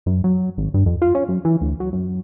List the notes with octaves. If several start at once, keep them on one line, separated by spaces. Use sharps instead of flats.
F#2
F#3
G#1
G2
F2
F4
C#4
F#2
E3
D2
F#3
F#2